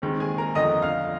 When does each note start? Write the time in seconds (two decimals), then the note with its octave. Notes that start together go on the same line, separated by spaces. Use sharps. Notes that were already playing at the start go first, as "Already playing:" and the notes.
0.02 D#2 D#3 G#3 C4
0.20 G#4 G#5
0.38 A#4 A#5
0.55 G1 F2 D3 D#5 D#6
0.82 F5 F6